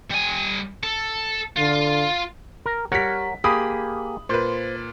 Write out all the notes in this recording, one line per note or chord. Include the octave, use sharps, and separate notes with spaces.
G3 G#5
A4
D3 F4
A#4
G3 A#4 C#5 F#5 B6
A#3 G4 G#4 B5 D#6
A#2 B4 C5